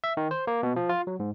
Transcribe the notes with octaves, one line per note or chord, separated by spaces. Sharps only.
E5
D#3
C5
A#3
B2
F3
F4
F#3
G#2